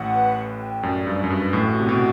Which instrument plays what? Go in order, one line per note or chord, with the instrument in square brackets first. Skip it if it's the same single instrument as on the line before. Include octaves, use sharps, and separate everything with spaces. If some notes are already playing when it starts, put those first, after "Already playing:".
Already playing: [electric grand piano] A1 A2 [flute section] F#5
[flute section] B4
B4
G5
[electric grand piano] F#2 [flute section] D5
[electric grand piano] G2 [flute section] B4
[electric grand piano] F#2
[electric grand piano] G2 [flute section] B4
[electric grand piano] A1 A2 [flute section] F#4
[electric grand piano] C3 [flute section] F#4
[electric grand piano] B2